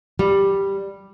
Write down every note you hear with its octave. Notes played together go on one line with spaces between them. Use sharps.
G3